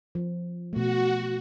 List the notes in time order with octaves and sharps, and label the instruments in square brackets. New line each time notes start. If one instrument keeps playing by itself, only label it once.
[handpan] F3
[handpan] B2 A3 [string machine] F#4